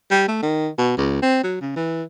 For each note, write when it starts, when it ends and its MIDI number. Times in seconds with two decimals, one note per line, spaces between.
0.11 0.25 55
0.28 0.39 57
0.42 0.69 51
0.78 0.94 47
0.97 1.19 37
1.22 1.39 60
1.44 1.56 54
1.61 1.75 49
1.76 2.03 52